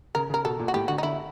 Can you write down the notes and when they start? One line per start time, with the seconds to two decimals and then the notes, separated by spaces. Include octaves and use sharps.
0.15 C#3 A#4
0.30 C#3
0.34 A#4
0.45 B2 A4
0.59 A#2
0.68 F#4
0.74 A2 G4
0.88 D3 F#4
0.98 D#4
1.03 D3 E4